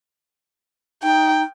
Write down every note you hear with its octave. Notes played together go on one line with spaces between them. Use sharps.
D#4 G5